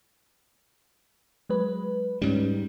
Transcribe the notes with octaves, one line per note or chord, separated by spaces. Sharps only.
F#3 G#3 B4
G#2 G3 C#4